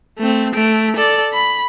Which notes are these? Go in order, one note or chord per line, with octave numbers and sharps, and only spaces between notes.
A3 C4
A3 D7
A4 D5
B5